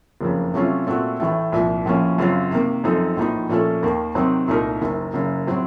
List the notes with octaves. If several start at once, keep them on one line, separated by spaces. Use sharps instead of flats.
F#1 F2 C#3
C3 F#3 A3 C#4 F4
A#2 A3 C4 F#4
A1 A2 A3
C2 A#2 F3
A#1 A2 F3 A#3 C#4
F#2 C#3 F#3 C4 F4
C3 D#3 A#3
F#2 F3 C4 D#4 A4
A#1 A2 F3 A#3 D#4
A#2 F3 A3 C#4 A4
D#2 D#3 A#3
C3 D#3 F#3 C4 D#4
C2 A#2 A3 D#4 A#4
F#1 F#2 D#3
F#1 F#2 C#3
A2 F#3 C4